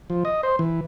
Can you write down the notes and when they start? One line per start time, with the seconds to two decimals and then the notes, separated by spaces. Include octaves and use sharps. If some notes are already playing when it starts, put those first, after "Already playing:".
0.10 F3
0.25 D#5
0.43 C5
0.59 E3